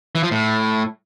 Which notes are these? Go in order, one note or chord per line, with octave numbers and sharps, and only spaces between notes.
E3
F3
A2